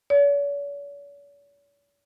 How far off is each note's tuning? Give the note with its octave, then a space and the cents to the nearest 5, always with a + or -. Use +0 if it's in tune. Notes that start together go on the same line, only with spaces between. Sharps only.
C#5 +45